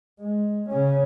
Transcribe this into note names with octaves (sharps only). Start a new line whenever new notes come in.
G#3
C#3 C#4